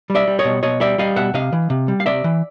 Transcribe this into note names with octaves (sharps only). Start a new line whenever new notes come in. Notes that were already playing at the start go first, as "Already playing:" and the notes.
G3
D5 E5
G3
C#5 D#5
B2
B2 C#5 D#5
G3 D5 E5
G3 D#5 F5
B2 E5 F#5
C3 D#5 F5
E3
C3
G3
F5
C3 D5 E5
E3